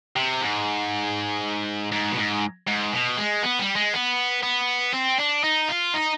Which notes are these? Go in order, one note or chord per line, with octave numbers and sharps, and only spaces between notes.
C3
G#2
G#2
B2
G#2
G#2
B2
G#3
B3
G3
G#3
B3
B3
C4
D4
D#4
F4
D#4